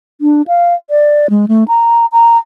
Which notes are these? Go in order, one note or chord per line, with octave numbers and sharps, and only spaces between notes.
D4
F5
D5
G#3
A3
A#5
A#5